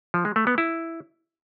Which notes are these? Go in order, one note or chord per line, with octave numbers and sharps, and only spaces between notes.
F3
G#3
A3
B3
E4